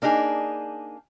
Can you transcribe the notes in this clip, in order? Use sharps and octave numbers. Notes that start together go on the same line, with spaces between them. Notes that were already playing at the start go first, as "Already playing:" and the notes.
A#3 D4 D#4 G#4